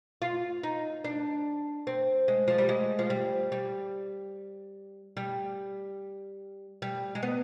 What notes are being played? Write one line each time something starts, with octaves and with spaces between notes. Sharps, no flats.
F4
D#4
D4
C4
G#3
F3
G3
G#3
F3
G3
G3
G3
G3
G#3
B3